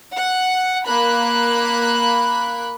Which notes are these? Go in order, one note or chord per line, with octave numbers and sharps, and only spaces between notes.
F#5
A#3 B5 F#6